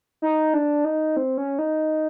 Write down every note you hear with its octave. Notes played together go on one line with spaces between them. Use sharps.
D#4
D4
D#4
C4
C#4
D#4